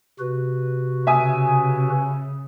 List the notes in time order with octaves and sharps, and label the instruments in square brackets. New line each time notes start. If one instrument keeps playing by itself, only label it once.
[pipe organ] C3 F#4 B4
[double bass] C#3 [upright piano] E5 G#5 D#6